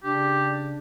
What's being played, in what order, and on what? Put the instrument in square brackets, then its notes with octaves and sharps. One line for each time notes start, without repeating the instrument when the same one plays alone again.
[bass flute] C#3 [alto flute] D4 [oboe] G4